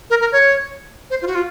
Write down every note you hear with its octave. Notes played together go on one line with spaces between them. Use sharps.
A#4
A#4
C#5
C5
F4
F#4
F4